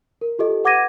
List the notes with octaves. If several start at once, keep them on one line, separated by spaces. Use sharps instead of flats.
A#4
F4 G4 A4 D#5
B4 F#5 D6 G#6 A#6 D#7